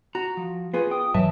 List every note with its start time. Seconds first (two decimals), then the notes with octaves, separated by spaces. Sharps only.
0.15 F#4 A#5
0.37 F3
0.74 B3 F4 G#4 B4
0.91 G5 D#6
1.14 G#2 E3 F#3 B4 E5 G5 A5